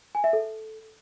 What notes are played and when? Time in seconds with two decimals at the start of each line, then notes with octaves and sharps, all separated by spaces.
0.15 G#5
0.24 E5
0.33 A4